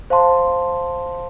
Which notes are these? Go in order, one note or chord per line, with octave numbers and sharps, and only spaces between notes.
C5 F5 A5 C6